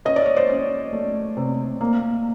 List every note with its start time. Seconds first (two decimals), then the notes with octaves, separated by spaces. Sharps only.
0.05 C#4 D#5
0.16 D5
0.26 C#5
0.36 C5 D5
0.49 C#4
0.93 A3
1.37 C3
1.81 A#3